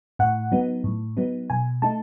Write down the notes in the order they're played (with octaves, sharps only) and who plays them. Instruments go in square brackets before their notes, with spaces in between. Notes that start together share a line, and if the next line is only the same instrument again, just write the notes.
[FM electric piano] A2 F#5
F#3 B3 D#4
A2
F#3 B3 D#4
B2 G#5
A3 D#4 A5